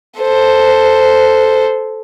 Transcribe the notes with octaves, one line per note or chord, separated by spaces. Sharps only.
A4 C5